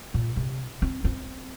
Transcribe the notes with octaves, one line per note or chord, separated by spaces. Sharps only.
A#2
C3
C4
C4